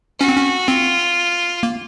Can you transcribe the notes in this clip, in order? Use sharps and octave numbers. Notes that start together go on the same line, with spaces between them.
C#4 F#4
C4
C#4
C4 F4
A#3